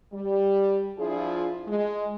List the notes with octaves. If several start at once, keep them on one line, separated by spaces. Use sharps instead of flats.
G3
F3 D4 E4 F4 G#4
G#3